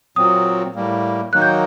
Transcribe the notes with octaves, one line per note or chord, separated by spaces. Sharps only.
A#2 F#3 C4 D#6
A2 G3 A#3
D#3 F#3 A#3 D#4 F#6
G6